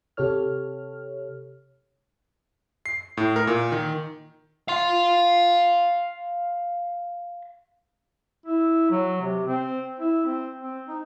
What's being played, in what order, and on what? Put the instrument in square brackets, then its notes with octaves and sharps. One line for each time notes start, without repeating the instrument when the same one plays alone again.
[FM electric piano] C3 G4 A4 C#5 F6
[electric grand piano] C7
A2
A#4
A#2
D#3
[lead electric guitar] F5 C6
[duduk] E4
F#3
C3
C4
E4
C4
C4
D#4